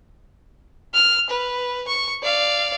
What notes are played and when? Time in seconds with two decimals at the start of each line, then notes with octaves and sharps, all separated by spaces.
0.94 F6
1.30 B4
1.87 C#6
2.22 D5 F5